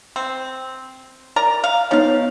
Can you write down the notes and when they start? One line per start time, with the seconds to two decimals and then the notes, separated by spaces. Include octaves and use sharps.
0.16 C4
1.36 A#4 D5 A#5
1.64 F5
1.91 F3 B3 D#4 C#5 F5